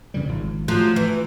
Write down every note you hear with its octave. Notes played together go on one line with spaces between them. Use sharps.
C#3 E3 G3
G#1 G#2 F3
F3 F#3 A3
E3